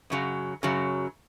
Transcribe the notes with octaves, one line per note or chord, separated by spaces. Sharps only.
F#2 C#3 F#3
F#2 C#3 F#3